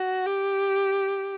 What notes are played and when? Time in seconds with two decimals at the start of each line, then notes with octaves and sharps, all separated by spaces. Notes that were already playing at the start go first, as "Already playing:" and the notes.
Already playing: F#4
0.25 G4